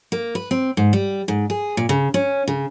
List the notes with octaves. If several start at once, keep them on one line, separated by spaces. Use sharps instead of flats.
A#3
B4
C4
G#2
G3
G#2
G#4
A#2
C#3
C#4
C#3